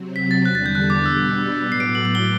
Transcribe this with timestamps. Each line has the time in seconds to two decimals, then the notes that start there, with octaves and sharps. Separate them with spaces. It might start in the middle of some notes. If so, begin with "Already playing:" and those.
Already playing: C3 F#3 C4
0.16 B6
0.31 A6
0.45 E2 D3 G3 D4 F#6
0.55 A6
0.66 G6
0.75 F#6
0.90 D6
1.05 B2 G3 B3 D4 E6
1.65 A2 F#3 B3
1.72 C7
1.80 D7
1.95 F#7
2.05 F#7
2.15 G7